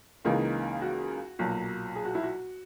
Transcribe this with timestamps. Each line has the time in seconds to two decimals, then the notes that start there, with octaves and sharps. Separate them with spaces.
0.25 C#2 C#3 E3 A#3 D#4
0.81 F#4
1.39 B1 A#2 F#3
1.96 G#4
2.05 F#4
2.15 E4
2.23 F#4